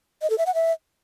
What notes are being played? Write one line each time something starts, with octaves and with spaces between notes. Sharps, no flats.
D#5
A4
E5
F#5
E5